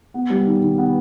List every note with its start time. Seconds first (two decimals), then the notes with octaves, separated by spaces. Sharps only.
0.14 B3
0.30 G3
0.46 D#3
0.62 D#3
0.78 B3